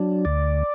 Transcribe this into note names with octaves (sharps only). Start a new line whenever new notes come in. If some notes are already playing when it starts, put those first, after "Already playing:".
Already playing: F#3 D4
D2 D5